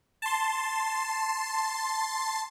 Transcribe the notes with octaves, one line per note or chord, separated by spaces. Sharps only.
A5 C6